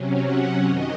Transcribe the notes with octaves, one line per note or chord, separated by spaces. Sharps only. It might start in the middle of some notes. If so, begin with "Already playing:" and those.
Already playing: C3 F#3 C#4
F#5
F#2 D#3 D#5